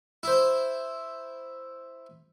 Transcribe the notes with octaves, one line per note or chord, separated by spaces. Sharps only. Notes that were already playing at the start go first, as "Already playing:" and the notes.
E4 C5